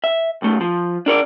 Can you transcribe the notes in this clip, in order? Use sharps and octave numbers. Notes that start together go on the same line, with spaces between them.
E5
B1 A3
F3
D4 A#4 C#5 D5